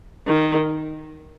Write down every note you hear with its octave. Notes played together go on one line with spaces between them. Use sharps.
D#3